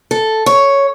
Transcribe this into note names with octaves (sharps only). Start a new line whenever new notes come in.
A4
C#5